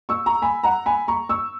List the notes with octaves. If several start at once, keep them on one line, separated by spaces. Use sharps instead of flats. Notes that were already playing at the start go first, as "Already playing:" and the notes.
C#6 E6
A#5 C#6
G#5 B5
F#5 A#5
G#5 B5
A#5 C#6
C#6 E6